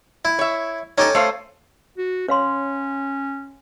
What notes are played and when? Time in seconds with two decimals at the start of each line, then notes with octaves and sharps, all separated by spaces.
0.25 E4
0.39 C#5 E5
0.98 C#4 D#4 G4 A4
1.15 A3 C5 F5
1.98 F#4
2.29 C#4 C#5 F5 C6